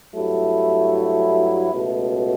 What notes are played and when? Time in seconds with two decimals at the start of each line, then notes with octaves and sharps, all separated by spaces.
0.13 G2 F#3 A3 E4
1.71 C#2 B2 A3